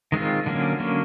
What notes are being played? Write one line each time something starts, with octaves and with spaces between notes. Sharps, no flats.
D#3 G#3 C4 F4
D3 F#3 A#3 C#4
D3 F#3 A#3 C#4